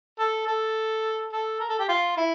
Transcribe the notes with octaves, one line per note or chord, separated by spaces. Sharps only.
A4
A4
A4
A#4
A4
G4
F4
E4